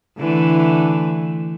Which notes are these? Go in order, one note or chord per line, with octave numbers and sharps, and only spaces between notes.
D3 E3 A3